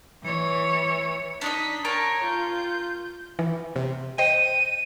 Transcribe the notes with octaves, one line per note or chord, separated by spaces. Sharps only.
E3 C#5
D4 D#4 D#5 B6
A#4 C#5 G5 A5
F4 G6
E3
C3
C5 D#5 G5 D#7